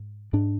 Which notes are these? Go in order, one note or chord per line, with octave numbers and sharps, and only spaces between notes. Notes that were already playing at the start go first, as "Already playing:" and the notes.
Already playing: G#2
G#2 D4